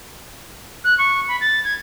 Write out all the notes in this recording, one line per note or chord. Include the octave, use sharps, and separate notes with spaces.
F#6
C#6
B5
A6
G#6